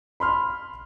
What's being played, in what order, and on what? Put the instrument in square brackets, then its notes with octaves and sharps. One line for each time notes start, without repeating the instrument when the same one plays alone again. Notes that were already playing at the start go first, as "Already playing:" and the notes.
[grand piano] B5 C6 F6